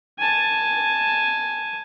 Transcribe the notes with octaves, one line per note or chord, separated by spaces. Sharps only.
G#5 A5